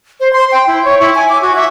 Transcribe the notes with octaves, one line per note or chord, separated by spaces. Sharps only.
C5
C6
G5
E4
C#5
E4
G#5
D6
F#4
E5